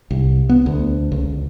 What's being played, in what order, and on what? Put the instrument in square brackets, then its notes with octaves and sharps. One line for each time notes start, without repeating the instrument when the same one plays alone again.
[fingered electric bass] C2
B3
D2
C#2